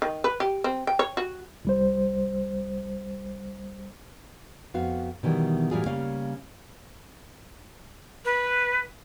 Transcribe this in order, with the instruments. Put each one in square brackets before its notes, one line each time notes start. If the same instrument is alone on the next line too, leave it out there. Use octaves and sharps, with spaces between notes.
[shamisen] D#3
B4
G4
C4
G5
C#5
F#4
[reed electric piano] C2 G3 C5
[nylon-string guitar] F2 B3 F#4 F5
B2 D#3 E3 G3
A2 E3 F#3 G3 F4 G#4
C#3 G3 A#3 C#4 F5
[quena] B4